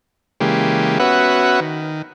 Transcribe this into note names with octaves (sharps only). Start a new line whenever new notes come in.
C#3 E3 G#3 A#3 G4
B3 C#4 F#4 B4 E5 F#5
D#3